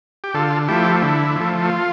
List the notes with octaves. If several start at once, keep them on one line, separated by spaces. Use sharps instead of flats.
G4
D3 F4 A4
F3 A3 E4 G4
D3 E4
F3 A3
F4